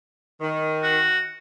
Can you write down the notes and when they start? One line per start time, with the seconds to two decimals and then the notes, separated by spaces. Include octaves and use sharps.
0.41 D#3
0.83 F#4